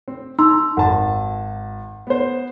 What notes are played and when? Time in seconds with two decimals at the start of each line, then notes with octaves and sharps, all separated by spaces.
0.08 C4
0.39 D#4 A#5 C6 E6
0.77 G#1 F#5 A5
2.07 B3 C5